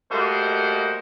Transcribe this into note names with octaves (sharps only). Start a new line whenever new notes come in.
G3 A3 A#3 F#4 C5 D#5